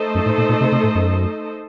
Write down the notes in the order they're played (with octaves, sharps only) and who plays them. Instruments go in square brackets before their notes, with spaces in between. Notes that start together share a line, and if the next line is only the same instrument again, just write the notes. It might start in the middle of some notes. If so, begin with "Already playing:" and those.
Already playing: [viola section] A3 D#4 A4 C5 D#5
[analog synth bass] F#2
A2
A#2
A#2
C3
C3
A2
F#2